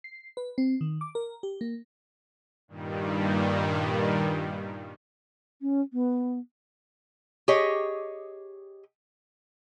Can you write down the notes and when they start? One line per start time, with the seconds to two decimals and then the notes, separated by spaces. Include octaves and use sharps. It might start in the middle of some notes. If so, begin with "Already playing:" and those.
0.04 C7
0.37 B4
0.58 C4
0.81 D#3
1.01 D6
1.15 A#4
1.43 G4
1.61 A#3
2.68 G2 A#2 D#3 G3
5.62 C#4
5.93 B3
7.48 G4 G#4 C#5 D#5